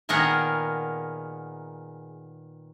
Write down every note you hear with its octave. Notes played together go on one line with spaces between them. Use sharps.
A#2 D#3 B3 G#4 A#4 F#5